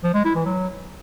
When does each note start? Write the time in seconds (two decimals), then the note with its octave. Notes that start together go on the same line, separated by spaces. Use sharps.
0.04 F3
0.14 G#3
0.25 E4
0.35 E3
0.45 F#3